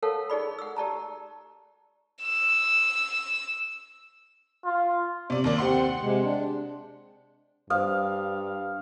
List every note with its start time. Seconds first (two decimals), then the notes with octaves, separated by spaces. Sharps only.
0.02 A4 A#4 C#5 F5 F#5 A5
0.30 D#4 G#4 D5 B5
0.59 F#5 E6
0.76 G4 D5 A5 A#5
2.23 E6
4.65 F4
5.30 C3 D5
5.44 D#2 A#3 D5
5.58 C4 G4 F#5 C6
6.01 C3 G#3
6.23 D4
7.70 G2 C5 F5 D#6